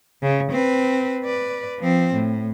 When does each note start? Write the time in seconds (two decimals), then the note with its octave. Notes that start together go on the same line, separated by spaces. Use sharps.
0.22 C#3
0.52 C4 B4
1.24 B4 D5
1.79 F3 C4
2.14 A2